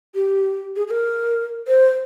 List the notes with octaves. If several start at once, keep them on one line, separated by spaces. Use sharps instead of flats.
G4
G#4
G#4
A#4
C5